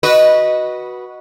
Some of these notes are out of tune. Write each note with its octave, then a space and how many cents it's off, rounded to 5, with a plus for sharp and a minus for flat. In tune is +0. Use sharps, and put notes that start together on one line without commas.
F#4 +0 B4 -15 D#5 +0